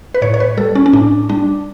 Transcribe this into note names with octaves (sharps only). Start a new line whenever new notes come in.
B4
A2 C#5
C#5
B4
G3 A4
C#4
C#4
A2 D4
G3 D4